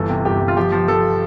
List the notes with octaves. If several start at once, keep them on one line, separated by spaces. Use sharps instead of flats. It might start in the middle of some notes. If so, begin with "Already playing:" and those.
Already playing: G1 E3 A4
C3
G1 G4
G1
F4
F3 G4
F3
F3 A4